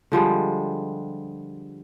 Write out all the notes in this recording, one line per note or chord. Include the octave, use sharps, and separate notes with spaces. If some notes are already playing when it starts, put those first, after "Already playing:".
D3 F3 G3 G#3